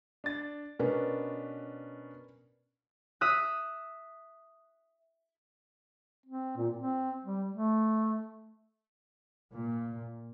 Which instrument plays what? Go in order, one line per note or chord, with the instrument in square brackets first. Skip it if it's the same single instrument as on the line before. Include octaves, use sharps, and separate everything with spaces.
[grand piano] D4 A6
[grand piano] B2 C#4 D4 [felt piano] A#4 B4
[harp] E5 D#6 F#6
[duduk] C4
A#2
C4
G3
A3
[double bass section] A#2